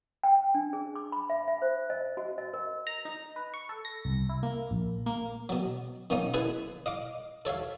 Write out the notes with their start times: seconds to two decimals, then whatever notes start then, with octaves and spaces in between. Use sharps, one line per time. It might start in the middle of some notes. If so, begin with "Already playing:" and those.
0.23 G5
0.55 D4
0.73 G#4
0.96 D6
1.12 B5
1.30 E5
1.48 E5
1.62 C5
1.90 D#5
2.17 F#4
2.38 D#5
2.54 A#4
2.87 A#5
3.05 D#4
3.36 B4
3.54 C#6
3.69 A4
3.85 A#6
4.05 C2
4.29 E4
4.43 A#3
4.71 A#1
5.06 A#3
5.49 B2 F#3
6.10 F#2 B2 A#3 C#4 D#4
6.34 E4 G#4 B4 G#5
6.86 D#5 F5 D6
7.45 A4 C#5 E5 F5